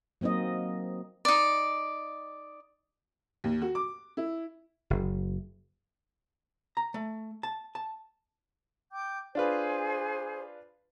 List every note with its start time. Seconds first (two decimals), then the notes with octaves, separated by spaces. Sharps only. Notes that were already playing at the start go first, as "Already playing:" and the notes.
0.21 F#3 A#3 C4 D#4 D#5
1.25 D#4 D5
3.44 D#2
3.62 F#4
3.75 D6
4.17 E4
4.90 F#1
6.77 A#5
6.94 A3
7.43 A5
7.75 A5
8.92 G5 D6 G6
9.35 D4 F4 G#4 B4 C5